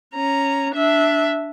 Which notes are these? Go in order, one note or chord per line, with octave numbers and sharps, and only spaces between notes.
C#4 A#5
D4 E5